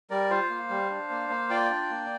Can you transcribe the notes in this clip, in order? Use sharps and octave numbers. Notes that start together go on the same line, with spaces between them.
G3 A#4 D5
F4 C5 F5
A#3
G3
D4
A#3
A#3
F4 D5 G5
D4
A#3